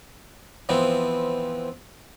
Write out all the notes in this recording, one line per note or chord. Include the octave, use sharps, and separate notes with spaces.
E3 F3 B3 C4